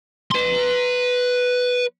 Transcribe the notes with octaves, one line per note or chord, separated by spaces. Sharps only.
B4 C6